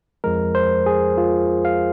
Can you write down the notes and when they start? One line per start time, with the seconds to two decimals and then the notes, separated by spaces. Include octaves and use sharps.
0.24 F2 F3 G#3 A#4
0.55 C5
0.86 G#4
1.18 F4
1.65 F5